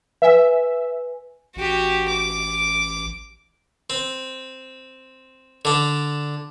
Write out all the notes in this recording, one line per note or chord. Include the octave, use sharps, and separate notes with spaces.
B4 E5 G#5
A1 F#4 G4
D6
C4
D3 D4